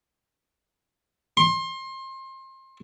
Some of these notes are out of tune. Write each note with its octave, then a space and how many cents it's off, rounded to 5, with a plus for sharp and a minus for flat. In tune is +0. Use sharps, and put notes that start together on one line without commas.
C6 +30